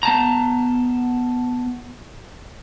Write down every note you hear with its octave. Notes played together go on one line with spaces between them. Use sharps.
B3 A5 A#5